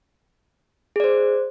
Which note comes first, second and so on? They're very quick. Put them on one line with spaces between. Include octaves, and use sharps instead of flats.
G#4 D5 C5